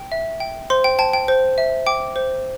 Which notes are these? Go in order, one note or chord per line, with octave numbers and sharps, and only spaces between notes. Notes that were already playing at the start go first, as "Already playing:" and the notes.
Already playing: G5
E5
G5
C5 C6
G5
G5 A5
G5
C5
E5
G5 D6
C5